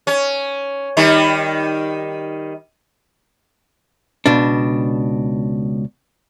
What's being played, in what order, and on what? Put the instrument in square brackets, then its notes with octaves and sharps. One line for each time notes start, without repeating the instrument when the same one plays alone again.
[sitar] C#4
D#3 G3 D#4
[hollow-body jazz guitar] C#2 B2 D4